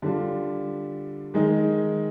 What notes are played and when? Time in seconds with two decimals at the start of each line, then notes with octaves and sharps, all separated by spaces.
0.02 D3 G3 D4 F4
1.34 D#3 G#3 D#4 G#4